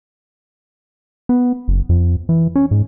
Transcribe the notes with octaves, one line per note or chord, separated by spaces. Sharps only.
B3
F#1
F2
E3
C#4
G#2